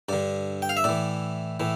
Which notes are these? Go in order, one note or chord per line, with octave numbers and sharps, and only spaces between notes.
G2 D3 D5
G5
F5
E5
A2 E3 D5
A2 E3